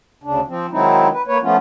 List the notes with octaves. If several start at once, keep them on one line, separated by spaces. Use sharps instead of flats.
D2 C#3 D4
F3 C4
D#3 F#3 G#3 C4 D#4 E4
B4
A#3 B4 C#5
F3 A3 B3 C#4 F4